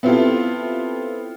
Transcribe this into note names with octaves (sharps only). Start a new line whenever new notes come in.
B3 C4 E4 F4 G4 A4